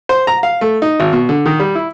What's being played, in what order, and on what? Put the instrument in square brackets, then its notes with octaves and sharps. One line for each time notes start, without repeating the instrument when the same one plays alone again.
[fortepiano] C5
A#5
F5
A3
D#4
G#1
B2
D3
D#3
G3
E4